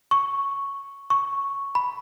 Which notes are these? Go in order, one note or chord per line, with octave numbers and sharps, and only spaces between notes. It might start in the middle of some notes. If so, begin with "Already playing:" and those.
C#6
C#6
B5